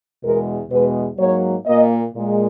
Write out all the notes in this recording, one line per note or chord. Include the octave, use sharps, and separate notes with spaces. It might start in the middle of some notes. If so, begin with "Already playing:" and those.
E2 B2 G#3 A#4
E2 B2 G#3 B4
G#2 F#3 A#3 C#5
A#2 A#3 D#5
A#2 G#3